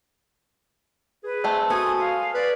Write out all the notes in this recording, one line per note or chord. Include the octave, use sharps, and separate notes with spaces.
G#4 B4
G#3 A3 C4
F#4 A4 G#5 D#6
F5
B4 D5